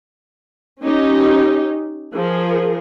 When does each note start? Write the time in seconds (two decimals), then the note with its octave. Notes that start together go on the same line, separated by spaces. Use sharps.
0.83 C#4 D#4 G4
2.14 F3 G#4 A#4